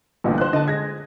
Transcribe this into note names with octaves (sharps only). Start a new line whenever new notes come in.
A1 G2 A#2 D3 F3
C5 F#6
D3 D#5 A5
G#3 G#6 A#6